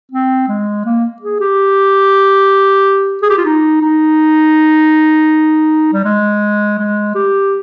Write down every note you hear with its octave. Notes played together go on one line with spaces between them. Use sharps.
C4
G#3
A#3
G#4
G4
G#4
G4
F4
D#4
D#4
G3
G#3
G#3
G4